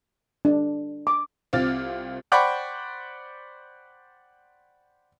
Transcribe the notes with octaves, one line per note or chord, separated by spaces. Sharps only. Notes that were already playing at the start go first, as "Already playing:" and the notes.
D4
D6
C2 C4 F4 D6 F6 A6
C5 D5 F#5 G5 B5 C#6